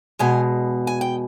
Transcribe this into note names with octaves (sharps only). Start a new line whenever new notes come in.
E2 B2 G#3 F#5 G#5
G#5
G5